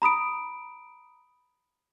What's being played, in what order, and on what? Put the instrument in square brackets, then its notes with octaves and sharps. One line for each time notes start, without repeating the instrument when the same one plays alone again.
[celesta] A#5 B5 D#6 D7